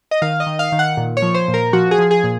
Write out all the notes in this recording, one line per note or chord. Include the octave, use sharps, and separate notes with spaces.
D#5
D#3 F5
D#5
D#3
F5
D#3
F#5
A#2
C#5
F3
C5
A#2
A#4
F3 F#4
G#4
F3
G#4
A#2